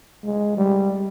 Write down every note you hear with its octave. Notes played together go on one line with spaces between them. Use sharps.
G#3
G3